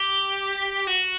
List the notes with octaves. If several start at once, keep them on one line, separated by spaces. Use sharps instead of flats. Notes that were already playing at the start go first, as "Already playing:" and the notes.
Already playing: G4
F#4